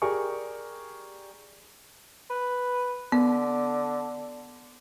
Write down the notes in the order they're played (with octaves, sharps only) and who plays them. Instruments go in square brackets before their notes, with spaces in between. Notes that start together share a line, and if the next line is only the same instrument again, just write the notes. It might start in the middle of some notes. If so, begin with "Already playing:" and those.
[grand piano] G4 G#4 A#4 D5 G#5 C#6
[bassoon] B4
[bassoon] D3 [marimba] B3